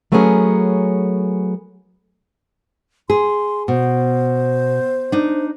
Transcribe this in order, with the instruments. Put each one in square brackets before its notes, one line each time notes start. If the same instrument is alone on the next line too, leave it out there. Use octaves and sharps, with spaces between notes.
[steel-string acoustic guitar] F#3 A3 B3 C#4 G#4 A#4
[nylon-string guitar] G#4 [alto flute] C6
[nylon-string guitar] B2 [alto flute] C5
[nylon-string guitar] D4 D#4